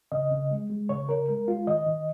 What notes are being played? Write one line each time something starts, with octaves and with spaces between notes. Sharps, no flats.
C#3 D#5
C#3
G#3
G#3
C#3 C#5
C#3 A#4
G#3 A#4
G#3 F4
D#3 D#5
D#3